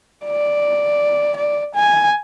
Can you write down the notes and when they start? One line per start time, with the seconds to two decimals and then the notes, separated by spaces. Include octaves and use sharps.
0.25 D5
1.37 D5
1.75 G#5